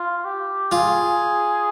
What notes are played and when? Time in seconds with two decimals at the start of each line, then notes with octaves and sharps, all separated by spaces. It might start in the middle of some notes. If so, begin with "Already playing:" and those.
Already playing: F4
0.25 G4
0.71 F4 G#4